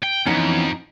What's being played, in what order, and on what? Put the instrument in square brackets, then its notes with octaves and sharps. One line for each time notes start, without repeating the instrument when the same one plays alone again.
[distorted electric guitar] G5
[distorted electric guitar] F2 [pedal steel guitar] E3 B3 C#4 [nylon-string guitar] D#4 F#5